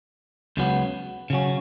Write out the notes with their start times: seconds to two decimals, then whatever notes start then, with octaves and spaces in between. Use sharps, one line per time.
0.57 C#2 C#3 F#3 B3
1.30 C#3 F#3 C#4